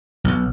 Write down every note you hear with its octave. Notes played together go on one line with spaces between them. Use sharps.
B1